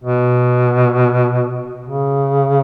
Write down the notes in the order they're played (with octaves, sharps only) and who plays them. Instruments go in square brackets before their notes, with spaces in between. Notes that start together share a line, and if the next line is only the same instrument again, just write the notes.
[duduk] B2
C#3